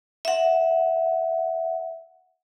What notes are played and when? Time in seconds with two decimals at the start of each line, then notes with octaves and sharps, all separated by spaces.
0.25 E5 F#5